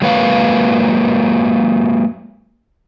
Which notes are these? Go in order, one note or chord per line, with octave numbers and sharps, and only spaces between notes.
F#3 G#3 A#3 B4 C#5 F5